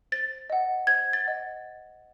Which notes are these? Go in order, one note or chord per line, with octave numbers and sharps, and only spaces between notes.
C5 A6
D#5 F#5
C5 G#6
A6
D#5 F#5